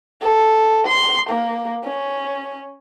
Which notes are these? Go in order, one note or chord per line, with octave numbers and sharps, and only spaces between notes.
A4
C6
A#3
C#4